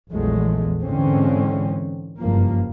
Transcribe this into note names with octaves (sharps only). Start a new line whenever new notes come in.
A#1 E2 F#3 G#3 A3
G#2 D3 E3 G#3 C4 C#4
F#1 G2 F3 A#3